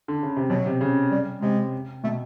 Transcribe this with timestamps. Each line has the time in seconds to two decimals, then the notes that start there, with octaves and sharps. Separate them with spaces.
0.08 D3
0.23 C#3
0.37 C3
0.50 B2 F#3
0.66 C3
0.81 C#3
1.11 G3
1.42 C3 G#3
2.04 B2 A3